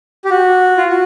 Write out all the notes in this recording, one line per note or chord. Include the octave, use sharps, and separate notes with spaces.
G4
F#4
F4
F#4